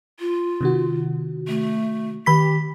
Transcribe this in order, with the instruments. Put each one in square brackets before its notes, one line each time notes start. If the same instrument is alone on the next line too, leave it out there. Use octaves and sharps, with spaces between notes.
[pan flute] F4
[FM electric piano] C3 D#3 F#4
[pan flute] A3
[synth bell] D#3 B5 B6 [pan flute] G4